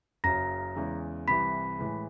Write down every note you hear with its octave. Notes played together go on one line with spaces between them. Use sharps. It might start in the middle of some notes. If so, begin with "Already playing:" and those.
F#1 F#2 C#3 F#3 A#5 A#6
E2 C#3 E3 G#3
C2 C3 E3 B5 B6
A2 E3 G#3